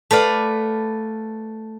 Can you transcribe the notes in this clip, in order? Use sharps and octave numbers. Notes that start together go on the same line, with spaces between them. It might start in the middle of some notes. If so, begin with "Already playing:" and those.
A3 B4 D5 F5